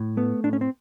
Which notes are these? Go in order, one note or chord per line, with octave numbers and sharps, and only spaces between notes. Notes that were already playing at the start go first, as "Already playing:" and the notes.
Already playing: A2
A3 B3
A2 D4
C#4
C4